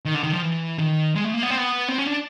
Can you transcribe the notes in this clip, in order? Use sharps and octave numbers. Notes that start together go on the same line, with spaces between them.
D#3
D3
D#3
F3
E3
D#3
G#3
A3
A#3
B3
C4
B3
C4
C#4
D4